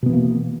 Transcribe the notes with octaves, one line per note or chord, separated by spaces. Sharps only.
B2 E3 A#3 B3